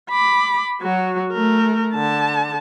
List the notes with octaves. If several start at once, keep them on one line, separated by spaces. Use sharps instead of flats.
B5 D6
F#3 F#4
A3 A#4
D3 A5